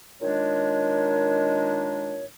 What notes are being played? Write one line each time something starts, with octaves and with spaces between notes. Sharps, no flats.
A#2 D#3 G#3 D4 C#5